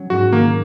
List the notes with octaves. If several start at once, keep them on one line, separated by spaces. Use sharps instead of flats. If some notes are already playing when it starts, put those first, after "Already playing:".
Already playing: F#3 C#4
G#2 F#4
D#3 A#3